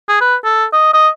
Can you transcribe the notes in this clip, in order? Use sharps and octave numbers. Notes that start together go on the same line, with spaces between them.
G#4
B4
A4
D#5
D#5